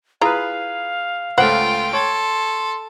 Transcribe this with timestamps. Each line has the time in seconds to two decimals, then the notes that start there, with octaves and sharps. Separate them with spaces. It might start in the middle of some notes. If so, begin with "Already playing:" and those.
0.21 E4 F4 G#4 B4 F5 A#5
1.38 C#2 A3 F4 C5 F#5 G5
1.93 A4 C#5 C6